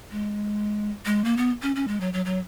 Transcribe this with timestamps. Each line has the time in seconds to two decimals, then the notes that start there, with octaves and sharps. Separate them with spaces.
0.11 G#3
1.06 G#3
1.25 A#3
1.37 B3
1.62 C#4
1.76 C#4
1.88 G#3
2.01 F#3
2.13 F#3
2.25 F#3